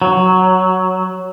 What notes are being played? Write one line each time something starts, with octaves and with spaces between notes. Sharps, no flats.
F#3